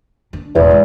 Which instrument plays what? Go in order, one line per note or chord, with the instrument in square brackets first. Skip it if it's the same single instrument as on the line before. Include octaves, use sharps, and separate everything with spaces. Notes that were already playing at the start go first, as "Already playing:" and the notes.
[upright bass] D4
[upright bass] E1 A2 [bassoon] E2
[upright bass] G#3